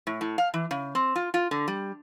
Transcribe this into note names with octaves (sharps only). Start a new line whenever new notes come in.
A2
A2
F5
E3
C#3
C4
F4
F4
D3
G3